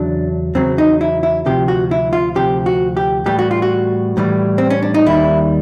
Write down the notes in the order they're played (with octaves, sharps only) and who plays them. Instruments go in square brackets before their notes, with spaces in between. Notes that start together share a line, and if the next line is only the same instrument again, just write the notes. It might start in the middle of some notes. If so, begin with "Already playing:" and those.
Already playing: [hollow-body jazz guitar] E2 C#3 F#3 D4
E2 C#3 F#3 C4
D#4
E4
E4
D2 C3 F3 G4
F#4
E4
F4
D2 C3 F3 G4
F#4
G4
A2 E3 G3 G4
F#4
F4
F#4
A2 E3 G3
C4
C#4
D4
D#4
D#2 D#3 G3 E4